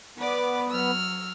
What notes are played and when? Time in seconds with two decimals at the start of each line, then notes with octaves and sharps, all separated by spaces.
0.18 B3 B4 D5 D6
0.70 F#3 E6 F6